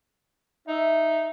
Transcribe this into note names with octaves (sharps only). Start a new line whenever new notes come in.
D#4 E5